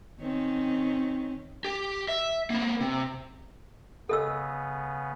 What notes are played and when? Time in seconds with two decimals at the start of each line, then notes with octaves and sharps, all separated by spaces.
0.20 D#3 C4 C#4
1.65 G4
2.08 E5
2.50 A#3 B3
2.81 C3
4.09 C#3 B3 A4 D#5 E6